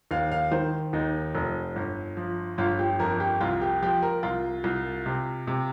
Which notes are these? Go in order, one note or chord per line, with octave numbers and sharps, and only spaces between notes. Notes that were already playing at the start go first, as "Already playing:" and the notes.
D#2 F5
F5
D#3 C5
D#2 D#4
F1
G1
F3
G1 F4
G4
F2 A#4
G4
C2 F4
G4
F3 G4
A#4
C2 F4
C2
C3
C3